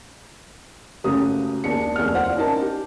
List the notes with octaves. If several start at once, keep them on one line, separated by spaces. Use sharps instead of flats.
F#1 C#3 A3 F#4 G4 D#6
D#2 D4 G#4 C#7
F1 D#2 G#4 D5 F6
F4 C5 D5 F#5
C#4 D#4 A#4 A5
G4